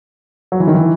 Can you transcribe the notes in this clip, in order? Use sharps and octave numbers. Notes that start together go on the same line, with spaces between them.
F#3
E3
D#3
E3